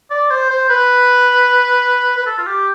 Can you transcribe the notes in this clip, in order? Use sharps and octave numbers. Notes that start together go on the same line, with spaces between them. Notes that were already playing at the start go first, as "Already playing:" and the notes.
D5
C5
C5
B4
B4
A4
F4
G4